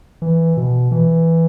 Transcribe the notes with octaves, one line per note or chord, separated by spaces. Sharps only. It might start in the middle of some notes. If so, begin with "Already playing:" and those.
E3
B2
E3